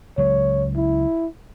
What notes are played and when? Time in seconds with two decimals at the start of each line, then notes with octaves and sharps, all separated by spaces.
0.18 C#2 F#3 C#5
0.76 E4